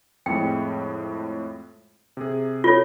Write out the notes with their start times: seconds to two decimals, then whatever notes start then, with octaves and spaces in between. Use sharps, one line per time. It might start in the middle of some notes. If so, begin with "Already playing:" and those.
0.26 F2 A2 G#3 G5
2.17 C3 G#4
2.64 F4 A4 C#5